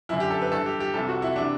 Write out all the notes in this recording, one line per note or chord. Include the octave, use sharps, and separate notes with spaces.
F#2 D3 E4
G4
A4
B4
G2 E3 A4
G4
G4
C2 C3 E3 A4
F#4
E4
C3 E3 D4